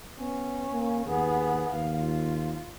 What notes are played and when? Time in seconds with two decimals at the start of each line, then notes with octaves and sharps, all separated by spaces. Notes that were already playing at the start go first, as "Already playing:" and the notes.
0.20 B3 C#4
0.73 A#3
1.06 D#2 B3 G#4
1.71 D#2 F5
2.00 F4